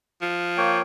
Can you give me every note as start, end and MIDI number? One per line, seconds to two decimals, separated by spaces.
0.22 0.80 53
0.57 0.82 58
0.57 0.82 73
0.57 0.82 79